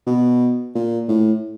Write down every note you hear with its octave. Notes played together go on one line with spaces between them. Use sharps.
B2
A#2
A2